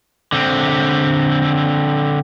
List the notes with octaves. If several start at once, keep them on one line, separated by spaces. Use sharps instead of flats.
D3 C4